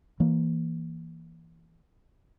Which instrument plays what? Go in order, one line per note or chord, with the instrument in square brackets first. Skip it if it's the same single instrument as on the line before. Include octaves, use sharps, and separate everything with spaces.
[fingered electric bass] E3 A#3